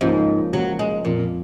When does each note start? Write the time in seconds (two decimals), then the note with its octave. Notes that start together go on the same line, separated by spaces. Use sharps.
0.01 C#2 G#2 C#3 F3 A#3 F4
0.53 C#2 C#3 F3 F#3 A#3 F4
0.79 G#3
1.05 F2 A#2 F3 G#3